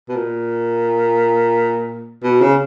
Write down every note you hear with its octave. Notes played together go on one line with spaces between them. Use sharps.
B2
A#2
B2
C#3